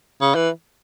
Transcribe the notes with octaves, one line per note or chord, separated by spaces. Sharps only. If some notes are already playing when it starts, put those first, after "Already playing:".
C#3
E3